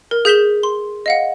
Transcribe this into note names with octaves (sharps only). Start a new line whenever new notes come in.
A#4
G#4 G6 B6 E7 G7
C6
D#5 F5 F#5